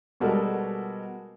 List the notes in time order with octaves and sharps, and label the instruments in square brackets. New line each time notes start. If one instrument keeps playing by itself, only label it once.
[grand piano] B2 G3 G#3 F#4 A4 A#4